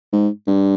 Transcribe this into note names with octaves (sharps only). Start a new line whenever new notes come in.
G#2
G2